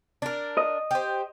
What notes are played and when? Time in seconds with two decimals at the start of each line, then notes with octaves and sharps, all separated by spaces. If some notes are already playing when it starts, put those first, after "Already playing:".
0.22 D4 A#4
0.57 D#5
0.91 G4 C5